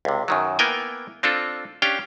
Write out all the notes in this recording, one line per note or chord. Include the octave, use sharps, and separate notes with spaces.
C#2 C3
F#2 D#3 F#3
A#3 B3 E4 A#4 G5 G#5
C4 D4 F4 A4
C#4 D4 G4 F5 G5